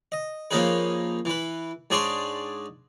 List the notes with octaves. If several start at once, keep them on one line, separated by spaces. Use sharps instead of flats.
D#5
F3 A#3 C#4 D#4 G#4 B4
E3 B4
G#2 D4 G#4 C#5 D5 C6